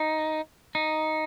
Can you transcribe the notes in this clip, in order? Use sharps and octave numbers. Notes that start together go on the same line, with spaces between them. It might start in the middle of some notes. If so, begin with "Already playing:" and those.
Already playing: D#4
D#4